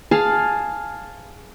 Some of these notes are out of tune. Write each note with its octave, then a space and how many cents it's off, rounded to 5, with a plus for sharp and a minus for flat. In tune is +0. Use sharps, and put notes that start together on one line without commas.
G#4 +0 F5 +5 A5 +0